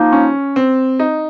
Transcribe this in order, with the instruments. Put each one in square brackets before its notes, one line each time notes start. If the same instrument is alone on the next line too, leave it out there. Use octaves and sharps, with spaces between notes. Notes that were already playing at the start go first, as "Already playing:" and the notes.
Already playing: [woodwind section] F3 A#3 D#4
[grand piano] C#4
C4
D#4